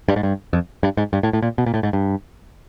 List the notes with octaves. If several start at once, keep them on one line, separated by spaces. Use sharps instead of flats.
G2
G#2
G2
F2
G2
G#2
G2
A2
A2
A#2
B2
A#2
A2
G#2
G2